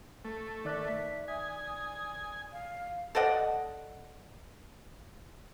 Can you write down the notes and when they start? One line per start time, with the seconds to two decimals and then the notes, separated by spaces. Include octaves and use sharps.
0.25 A3
0.65 D#3 D5 E5 F#6
1.28 G#5 D#6
2.52 F5
3.15 A4 D5 D#5 F#5